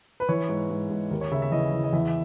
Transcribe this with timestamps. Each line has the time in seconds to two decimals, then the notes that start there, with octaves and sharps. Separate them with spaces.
0.20 B4
0.29 E3 C#5
0.49 G#2
0.70 G#2
0.91 G#2
1.11 D#2 A#4
1.21 C#5
1.31 C#3 E5
1.42 E5
1.51 E3 D#5
1.72 E3
1.84 D#5
1.93 E2 E5
2.07 E5